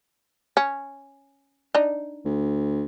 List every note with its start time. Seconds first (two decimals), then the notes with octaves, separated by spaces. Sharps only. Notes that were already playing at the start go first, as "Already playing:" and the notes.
0.57 C#4
1.75 D4 D#4
2.25 D2